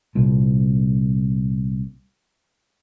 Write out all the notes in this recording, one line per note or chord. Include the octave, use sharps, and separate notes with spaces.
C2 A#2